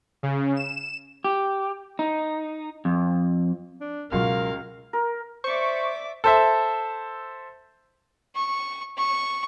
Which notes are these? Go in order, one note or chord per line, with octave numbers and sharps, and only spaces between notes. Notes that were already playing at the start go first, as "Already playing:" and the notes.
C#3
E7
G4
D#4
F2
D4
C#2 B2 F#3 F4 F#4 A#4 F5
A#4
C5 D5 E5 C#6 D6
A4 C5 E5
C#6
C#6